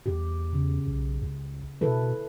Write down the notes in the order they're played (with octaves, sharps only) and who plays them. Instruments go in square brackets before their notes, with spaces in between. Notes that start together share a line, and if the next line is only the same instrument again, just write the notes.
[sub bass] E2 [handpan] G4
[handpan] C#3
[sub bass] B1
C#2
[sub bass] B2 [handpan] E4 A4 B4